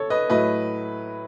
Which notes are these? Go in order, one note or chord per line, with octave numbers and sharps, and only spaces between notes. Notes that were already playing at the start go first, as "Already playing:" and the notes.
Already playing: A4 C#5
B4 D#5
A2 F#3 A3 B4 D#5